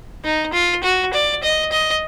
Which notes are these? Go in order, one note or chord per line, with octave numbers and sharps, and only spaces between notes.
D#4
F4
F#4
D5
D#5
D#5